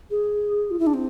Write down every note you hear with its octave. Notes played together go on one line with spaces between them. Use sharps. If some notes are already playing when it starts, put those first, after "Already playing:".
G#4
F4
E4
D4
C4